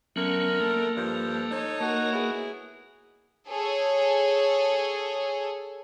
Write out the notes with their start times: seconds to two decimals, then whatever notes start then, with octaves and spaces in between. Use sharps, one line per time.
0.16 D3 F#3 A3 B3 C#4 A#4
0.61 A#3 A4
0.96 G2 F3
1.51 D#4 C#5
1.80 A#3 F#4 A#4
2.13 B3 E4 G#4
3.48 G#4 A4 C#5